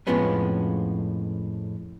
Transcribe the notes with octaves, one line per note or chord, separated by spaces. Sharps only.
F2 A2 F3 G#3 B3 C#4